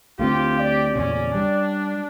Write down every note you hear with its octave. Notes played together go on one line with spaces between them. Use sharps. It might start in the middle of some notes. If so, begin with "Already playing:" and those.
D2 A3 C4 F4 G4
D5
E2 A#2 C#3 C#4
G3 D4